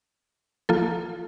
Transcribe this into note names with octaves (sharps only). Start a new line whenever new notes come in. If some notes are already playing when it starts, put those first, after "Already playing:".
F3 A#3 F4 A4